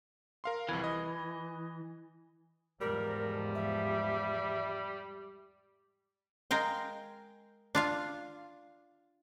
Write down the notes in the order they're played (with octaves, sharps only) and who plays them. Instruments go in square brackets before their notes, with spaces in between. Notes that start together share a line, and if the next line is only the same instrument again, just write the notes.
[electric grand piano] A#4 F5 C6
[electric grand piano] C2 F2 G#6 [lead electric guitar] E3
[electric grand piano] D#5
[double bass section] E2 G#2 F3 [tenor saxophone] G3 [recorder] A#4
[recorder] E5
[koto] G#3 A#4 F5 G5
D4 F4 F5